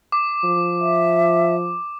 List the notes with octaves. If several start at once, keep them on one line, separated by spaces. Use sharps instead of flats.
D6
F3
E5